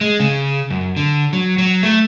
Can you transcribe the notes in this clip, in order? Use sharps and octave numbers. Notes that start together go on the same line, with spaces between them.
G#3
C#3
F#2
D3
F#3
F#3
A3